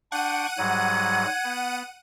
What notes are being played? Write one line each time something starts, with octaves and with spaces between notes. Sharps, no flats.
D4 F#5 G5 C#6 D#7
G#2 F#3 G3 G#6
B3